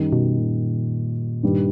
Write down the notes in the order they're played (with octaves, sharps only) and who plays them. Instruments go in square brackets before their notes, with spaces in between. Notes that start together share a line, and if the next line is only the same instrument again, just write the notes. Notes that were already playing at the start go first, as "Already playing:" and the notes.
Already playing: [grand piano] F#2 D#3 G3
[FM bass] B2
A#2
[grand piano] G2 D#3 G3